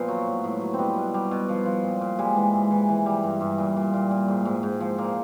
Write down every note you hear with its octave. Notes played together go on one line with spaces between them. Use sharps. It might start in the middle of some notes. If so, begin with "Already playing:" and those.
Already playing: A#2 F3 B3
F#3
A2
A2
F#3
C4
G3 B3
B2
G3
B2
F3
F3
A#2
A#2
G3 G#3
E3
G#2
E3
E3
G3
G2
G2
A#2
A#2
A#2
A#2
G#2
G#2
G#2
F3
A#2 A#3